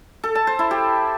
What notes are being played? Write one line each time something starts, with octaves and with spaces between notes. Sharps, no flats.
A4
A5
C5
E4
G4